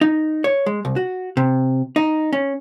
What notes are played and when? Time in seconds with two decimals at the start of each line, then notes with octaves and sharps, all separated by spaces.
0.01 D#4
0.44 C#5
0.66 G#3
0.85 C2
0.96 F#4
1.37 C3
1.96 D#4
2.33 C#4